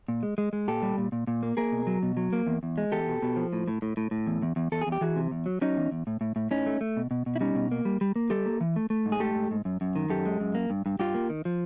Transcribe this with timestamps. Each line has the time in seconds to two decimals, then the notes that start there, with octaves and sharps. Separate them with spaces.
0.08 A#2
0.23 G#3
0.38 G#3
0.53 G#3
0.68 A#2 G4 A4
0.82 G3
0.98 A#2
1.12 A#2
1.27 A#2
1.43 A#3
1.57 A#3 G#4 A#4
1.72 B2
1.87 F#3
2.03 B2
2.17 F#3
2.33 A#3
2.47 E2
2.63 E2
2.78 G#3
2.92 E2 G4 A4
3.08 B2
3.22 B2
3.36 F3
3.53 A2
3.68 A2
3.82 A2
3.97 A2
4.11 A2
4.27 E2
4.42 E2
4.56 E2
4.72 E2 A4
4.81 G#4
4.87 E2
4.92 G4
5.01 E3 F#4 G#4
5.16 C3
5.31 E2
5.46 F#3
5.61 F#3 C#4 D#4
5.77 E2
5.91 E2
6.07 A2
6.21 A2
6.36 A2
6.51 A2 C#4 D#4
6.66 A3
6.81 A3
6.97 B2
7.11 B2
7.26 B2
7.36 E4
7.40 G3 C#4 D#4
7.55 B2
7.72 A#3
7.85 G3
8.01 G3
8.16 A#3
8.30 G3 G4 A4
8.46 A#3
8.61 E3
8.76 A3
8.90 A3
9.06 G#2
9.12 G#4
9.20 A3 G4 A4
9.35 G#2
9.51 G#2
9.65 F#2
9.81 F#2
9.96 D#3
10.10 F#2 G4 A4
10.26 G#3
10.40 F#2
10.55 A#3
10.70 G2
10.86 G2
10.99 G2 F4 G4
11.14 A#3
11.30 D#3
11.45 F3